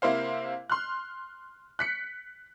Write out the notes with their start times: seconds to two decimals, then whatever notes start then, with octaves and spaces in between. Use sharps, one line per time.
0.02 C3 A#3 E4 C5 F5
0.70 C6 F6 F#6
1.79 F#6 B6 C#7